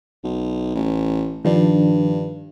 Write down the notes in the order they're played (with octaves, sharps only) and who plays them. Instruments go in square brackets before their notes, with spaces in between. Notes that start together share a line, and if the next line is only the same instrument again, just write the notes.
[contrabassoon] B1
A1
[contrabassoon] G2 [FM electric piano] D#3 F3 D4